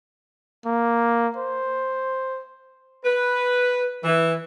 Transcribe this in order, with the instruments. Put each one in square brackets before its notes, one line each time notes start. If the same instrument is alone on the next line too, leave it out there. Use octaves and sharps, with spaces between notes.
[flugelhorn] A#3
C5
[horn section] B4
E3